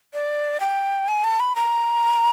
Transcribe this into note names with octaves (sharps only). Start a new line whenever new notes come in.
D5
G5
G#5
A5
B5
A#5